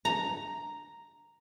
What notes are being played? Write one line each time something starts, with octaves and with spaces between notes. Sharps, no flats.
A#5